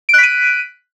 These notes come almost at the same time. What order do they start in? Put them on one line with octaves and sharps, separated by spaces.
D7 F#6 B6 D#7